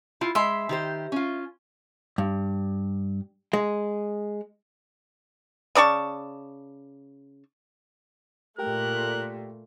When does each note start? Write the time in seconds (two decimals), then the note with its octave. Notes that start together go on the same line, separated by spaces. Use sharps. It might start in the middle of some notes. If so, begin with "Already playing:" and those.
0.21 E4 F4
0.35 G#3 E5 B5 C6
0.69 D#3 G4 C5
1.12 C#4 F4
2.18 G2
3.53 G#3
5.75 C#3 D5 A5 C#6
8.59 A#2 A3 G4 A#4 G5 F#6